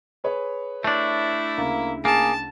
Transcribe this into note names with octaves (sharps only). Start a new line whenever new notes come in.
G#4 B4 C#5
A3 D4 E4
D2 C#3 A#3
A#3 G#4 A5